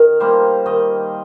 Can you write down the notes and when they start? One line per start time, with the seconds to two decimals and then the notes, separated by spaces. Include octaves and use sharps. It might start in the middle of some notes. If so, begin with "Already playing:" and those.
Already playing: D#3 A#4
0.20 G3 A#3 C5
0.66 D#3 D#5